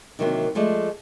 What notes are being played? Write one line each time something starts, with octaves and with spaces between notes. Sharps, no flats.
C3 D#3 E3 F#3 A#3 C4
F3 G#3 A3 D5